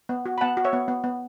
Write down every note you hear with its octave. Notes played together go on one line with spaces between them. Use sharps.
B3
F#4
B5
B3 F#5 A5
F#4
C#5 E5
B3
B3
B3